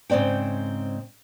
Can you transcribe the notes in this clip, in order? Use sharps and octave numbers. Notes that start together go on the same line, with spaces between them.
G#2 C#3 C4 D5 G5